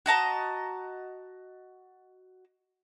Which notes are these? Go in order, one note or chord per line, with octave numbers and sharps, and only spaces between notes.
F#4 D#5 A5 A#5